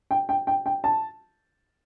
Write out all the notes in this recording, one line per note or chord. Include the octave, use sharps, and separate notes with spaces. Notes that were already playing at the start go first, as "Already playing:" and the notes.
G5
G5
G5
G5
A5